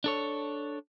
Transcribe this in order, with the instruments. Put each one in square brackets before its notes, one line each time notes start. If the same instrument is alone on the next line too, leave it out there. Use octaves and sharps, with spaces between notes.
[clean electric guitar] D4 A4 C#5